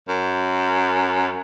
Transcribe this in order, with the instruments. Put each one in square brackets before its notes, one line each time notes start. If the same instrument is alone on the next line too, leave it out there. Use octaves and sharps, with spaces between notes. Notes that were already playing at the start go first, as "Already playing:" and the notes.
[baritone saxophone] F#2